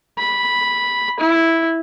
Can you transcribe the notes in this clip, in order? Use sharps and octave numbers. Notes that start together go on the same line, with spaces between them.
B5
E4